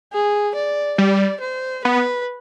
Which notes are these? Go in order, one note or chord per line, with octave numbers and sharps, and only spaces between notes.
G#4
D5
G3 D5
C5
B3 B4